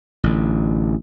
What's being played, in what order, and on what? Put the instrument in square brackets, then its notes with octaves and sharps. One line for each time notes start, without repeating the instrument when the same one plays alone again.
[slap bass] A1 D3